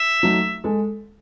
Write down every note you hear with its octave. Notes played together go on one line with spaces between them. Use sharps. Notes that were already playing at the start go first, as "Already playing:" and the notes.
Already playing: E5
F#3 A3 D#4
G#3 A4